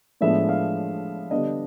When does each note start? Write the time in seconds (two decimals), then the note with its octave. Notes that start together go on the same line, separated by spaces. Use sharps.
0.21 A2 F3 G#3 B3 D4 E5
0.49 F5
1.31 D3 G3 B3 D4 D#5